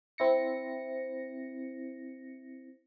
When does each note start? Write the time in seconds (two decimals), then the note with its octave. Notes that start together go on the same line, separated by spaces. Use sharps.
0.18 C4 E4 A#6 C#7